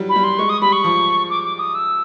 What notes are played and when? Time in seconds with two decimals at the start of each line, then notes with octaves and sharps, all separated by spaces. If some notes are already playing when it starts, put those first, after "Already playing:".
Already playing: E3 F#3 G3
0.09 B5
0.16 G3
0.24 C6
0.39 G#3 C#6
0.49 D#6
0.61 G3 B5
0.73 C#6
0.84 F3
1.30 D6
1.44 D6
1.59 D#6
1.75 E6